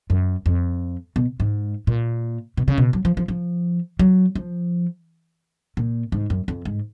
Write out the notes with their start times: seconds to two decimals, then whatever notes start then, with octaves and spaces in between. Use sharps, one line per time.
0.10 F#2
0.46 F2
1.16 B2
1.40 G#2
1.87 A#2
2.57 B2
2.68 C#3
2.78 B2
2.93 F#3
3.05 F3
3.17 F3
3.28 F3
3.99 F#3
4.35 F3
5.77 A#2
6.12 G#2
6.30 F#2
6.48 F2
6.65 G#2